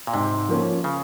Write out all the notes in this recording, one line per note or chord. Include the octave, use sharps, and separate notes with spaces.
A#2
G#2 C3
F3 A#3 C#4
C#3